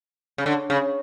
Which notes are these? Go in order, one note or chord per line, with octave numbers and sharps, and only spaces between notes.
C#3
D3
C#3